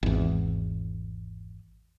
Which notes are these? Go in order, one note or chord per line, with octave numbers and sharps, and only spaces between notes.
G#1 E2